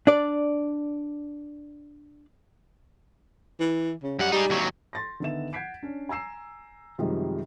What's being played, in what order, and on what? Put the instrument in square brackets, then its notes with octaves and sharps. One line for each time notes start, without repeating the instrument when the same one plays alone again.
[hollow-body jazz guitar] D4 D5
[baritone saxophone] E3
C#3
[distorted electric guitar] F#2 F#5 [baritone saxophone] G3
[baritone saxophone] G3 [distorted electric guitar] D#4 G#4
[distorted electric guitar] D#2 F#3
[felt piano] C6 A6 A#6
D3 D#3 B3 E5 E7
F#5 G6 G#6 B6 C7 D7
C#4 D4
G#5 A#5 E6 C7 E7
F#2 C3 D#3 F3 G3 G#3